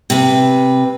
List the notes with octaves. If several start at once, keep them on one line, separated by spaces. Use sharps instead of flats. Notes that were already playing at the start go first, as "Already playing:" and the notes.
C3 B4